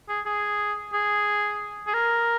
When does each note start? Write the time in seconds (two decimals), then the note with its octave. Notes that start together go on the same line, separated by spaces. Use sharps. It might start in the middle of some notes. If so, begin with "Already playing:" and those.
0.09 G#4
0.26 G#4
0.93 G#4
1.87 G#4
1.94 A#4